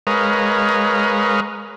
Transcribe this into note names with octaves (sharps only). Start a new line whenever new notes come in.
G#3 A#4 B4 C#5 D#5 F5